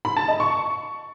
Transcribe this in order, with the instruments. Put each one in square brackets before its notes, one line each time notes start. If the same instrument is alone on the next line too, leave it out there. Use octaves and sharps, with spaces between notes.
[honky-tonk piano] B5
A5
D#5
C#6